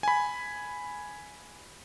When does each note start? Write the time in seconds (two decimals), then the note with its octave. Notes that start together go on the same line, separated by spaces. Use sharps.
0.03 G#5 B5